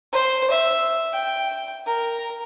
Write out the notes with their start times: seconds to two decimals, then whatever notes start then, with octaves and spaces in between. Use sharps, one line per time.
0.12 C5
0.50 E5
1.13 G5
1.86 A#4